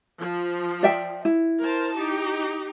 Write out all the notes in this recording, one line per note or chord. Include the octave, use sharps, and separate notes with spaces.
F3
D5 E5 G5
E4
A#4 C5 A5
D#4 G4